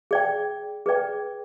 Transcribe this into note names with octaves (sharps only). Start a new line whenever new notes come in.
G#4 D5 G5
G#4 B4 D5 G5